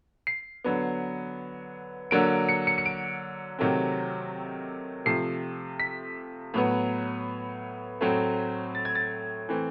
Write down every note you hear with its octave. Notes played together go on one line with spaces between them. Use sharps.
C7
D3 F#3 B3
D3 F#3 A#3 D7
C#7
C#7
C#7
D7
C3 D#3 F#3 A3 C4
C3 F3 A3 C7
B6
A2 F#3 B3
A2 F#3 A3 C4
A6
G#6
A6
E3 A3 C4